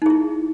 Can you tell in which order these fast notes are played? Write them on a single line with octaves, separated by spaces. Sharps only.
D#4 G#4 E4